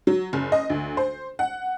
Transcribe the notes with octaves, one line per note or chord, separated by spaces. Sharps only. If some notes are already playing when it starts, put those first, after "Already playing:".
F#3
F#1
D#5
D2
C5
F#5